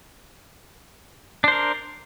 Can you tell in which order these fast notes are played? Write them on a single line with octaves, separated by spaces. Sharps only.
D4 C5 A#4